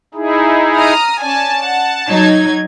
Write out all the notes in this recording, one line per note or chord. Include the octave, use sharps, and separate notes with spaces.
D#4 E4 G#4
A#5 D#6 F6
C#4 D5 G#5 A5
F#5
F#3 D#4 G#6